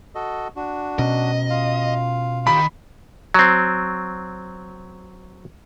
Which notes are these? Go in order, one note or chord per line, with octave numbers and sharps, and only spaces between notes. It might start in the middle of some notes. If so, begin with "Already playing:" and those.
F#4 A4 D#5
D4 F#4
B2 C#4 D#5
F4 F5
D#3 F4 G4 B5
F#3 C4